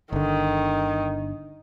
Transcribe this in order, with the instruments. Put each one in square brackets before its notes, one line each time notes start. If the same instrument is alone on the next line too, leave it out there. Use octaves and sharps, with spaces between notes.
[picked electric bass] G1 D3 [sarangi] D#3